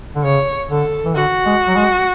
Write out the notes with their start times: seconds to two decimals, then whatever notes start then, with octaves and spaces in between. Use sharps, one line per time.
0.15 D3
0.24 C#3 C#5
0.69 D3 A4
1.04 E3
1.15 D3 F#4
1.46 G#3
1.68 F#3
1.76 G#3